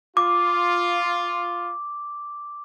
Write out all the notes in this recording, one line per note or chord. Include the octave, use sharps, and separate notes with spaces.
F4 D6